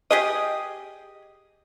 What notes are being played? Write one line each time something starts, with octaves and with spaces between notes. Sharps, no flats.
G4 G#4 D#5